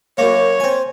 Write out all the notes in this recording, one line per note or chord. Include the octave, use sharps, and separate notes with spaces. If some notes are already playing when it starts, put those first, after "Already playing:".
F#2 A#3 C#5
C4 G#5